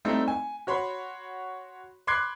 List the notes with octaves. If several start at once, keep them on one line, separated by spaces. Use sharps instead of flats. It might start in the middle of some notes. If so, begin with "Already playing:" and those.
G3 A3 C4 D#4 E4
G#5
F#4 C#5 B5 C6
B5 C6 D6 F#6 G#6 C7